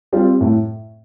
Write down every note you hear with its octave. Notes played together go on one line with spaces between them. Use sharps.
G3 C4 F4
A2